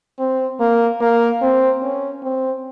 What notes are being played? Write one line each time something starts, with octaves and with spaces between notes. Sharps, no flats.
C4
A#3
A#3
C4
C#4
C4